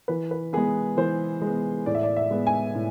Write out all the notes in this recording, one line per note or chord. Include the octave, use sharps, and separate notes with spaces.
E3 B4
B4
G#3 B3 G#4
E3 C5
G#3
B3
A2 D5
E5
D5
E5
G#3 B3
G#5
A2